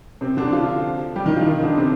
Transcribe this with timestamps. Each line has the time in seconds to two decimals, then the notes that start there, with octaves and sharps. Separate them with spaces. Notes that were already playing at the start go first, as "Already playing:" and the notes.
0.21 C3 C4
0.37 D3 D4
0.53 F3 F4
1.15 G3 G4
1.26 D#3 D#4
1.36 F3 F4
1.46 D#3 D#4
1.62 D3 D4
1.77 C3 C4